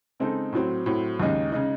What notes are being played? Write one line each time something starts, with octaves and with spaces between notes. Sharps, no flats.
C#3 G#3 C4 D#4 A4
A2 F#3 C4
A2 F#3 C4
D#2 C#3 G#3 D#4
C#3 G#3 D#4